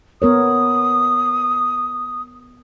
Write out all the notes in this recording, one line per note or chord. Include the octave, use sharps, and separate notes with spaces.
B3 A#4 C#5 D#6